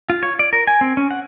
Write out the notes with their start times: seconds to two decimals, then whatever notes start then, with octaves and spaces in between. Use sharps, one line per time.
0.10 F4
0.23 C#5
0.39 D5
0.53 A#4
0.67 G#5
0.81 C4
0.97 C#4
1.11 F#5